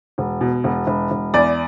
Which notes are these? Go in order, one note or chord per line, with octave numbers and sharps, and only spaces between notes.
E1
B2
E1
E1
E1
E2 D5